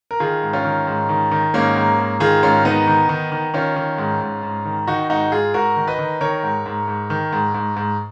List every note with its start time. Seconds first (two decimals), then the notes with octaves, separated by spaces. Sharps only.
0.11 A#4
0.20 D#3 F4 G#4
0.42 G#2
0.53 C#4 F4
0.65 D#3
0.87 G#2
1.09 D#3
1.32 D#3
1.54 G#2 A#3 C#4
1.76 G#2
1.98 G#2
2.20 D#3 F4 G#4
2.43 G#2 C#4 F4
2.65 D#3 B3 D#4
2.87 D#3
3.09 D#3
3.32 D#3
3.54 D#3 C#4 F4
3.76 D#3
3.98 G#2
4.21 G#2
4.43 G#2
4.65 D#3
4.87 D#3 D#4 F#4
5.10 G#2 D#4 F#4
5.32 G#2 F4 G#4
5.54 G#2 F#4 A#4
5.77 D#3
5.87 B4 D#5
5.99 D#3
6.21 D#3 A#4 C#5
6.43 G#2
6.66 G#2
6.88 G#2
7.10 D#3
7.33 G#2
7.54 G#2
7.77 G#2